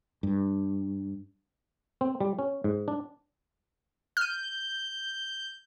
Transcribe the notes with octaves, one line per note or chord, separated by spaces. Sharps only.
G2
C4
G3
C#4
G#2
D4
F6 G6 D#7